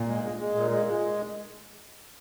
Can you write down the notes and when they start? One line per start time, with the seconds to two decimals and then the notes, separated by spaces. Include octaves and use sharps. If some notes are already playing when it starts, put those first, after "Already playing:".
Already playing: A#2
0.08 G#3
0.23 G#3
0.39 G#3
0.55 A#2
0.71 G#3
0.86 G#3